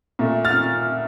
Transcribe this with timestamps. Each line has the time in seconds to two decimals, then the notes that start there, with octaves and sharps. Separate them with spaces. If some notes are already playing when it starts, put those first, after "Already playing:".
0.19 A#2 A3
0.45 F6 A6